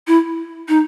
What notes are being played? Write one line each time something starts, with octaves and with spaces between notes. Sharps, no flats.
E4
D#4